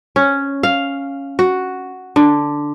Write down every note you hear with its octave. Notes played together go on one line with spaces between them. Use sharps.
C#4
F5
F#4
D3